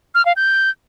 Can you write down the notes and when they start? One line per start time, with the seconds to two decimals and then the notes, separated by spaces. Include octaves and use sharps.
0.15 F6
0.26 F5
0.36 G6